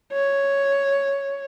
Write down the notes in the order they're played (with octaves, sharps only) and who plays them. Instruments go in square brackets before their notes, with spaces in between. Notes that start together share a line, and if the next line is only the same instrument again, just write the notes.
[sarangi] C#5